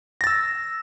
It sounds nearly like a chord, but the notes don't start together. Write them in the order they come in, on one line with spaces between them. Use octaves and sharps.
A#6 A6 E6